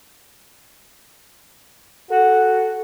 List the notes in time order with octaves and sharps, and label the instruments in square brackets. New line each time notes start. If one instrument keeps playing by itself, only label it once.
[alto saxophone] F#4 [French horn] A4